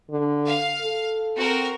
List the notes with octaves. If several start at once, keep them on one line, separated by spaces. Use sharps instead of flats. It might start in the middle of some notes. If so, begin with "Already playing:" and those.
D3
F5
A4
C4 F#4 A#4